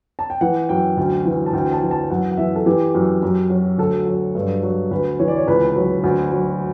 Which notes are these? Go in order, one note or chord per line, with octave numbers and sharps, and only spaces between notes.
A5
G5
E3 F#5
F#2 G5
D2
E3
A5
D2 G5
A5
E3
A5
F#2 F#5
F#5
E3 E5
A4
E3 G4
F#2
F#2
F#3
D2 A4
F#3
G2
F#3
D2 B4
E3 C#5
D5
C#5
C#2 B4
F#3
D2
F#3